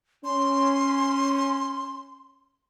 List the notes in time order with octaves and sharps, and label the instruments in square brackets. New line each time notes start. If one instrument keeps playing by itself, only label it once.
[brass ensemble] C#4 [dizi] C6